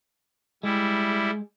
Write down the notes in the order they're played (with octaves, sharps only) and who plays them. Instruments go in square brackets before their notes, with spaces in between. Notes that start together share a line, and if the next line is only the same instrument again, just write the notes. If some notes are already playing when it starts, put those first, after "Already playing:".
[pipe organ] G3 E4 [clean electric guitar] G#3